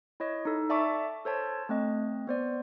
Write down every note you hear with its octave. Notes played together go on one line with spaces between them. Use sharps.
E4 C#5 D#5
D#4 A4
D5 E5 A5 C#6 D6
A4 C5 C#5 A5
A3 C4 D#5
B3 C5 D5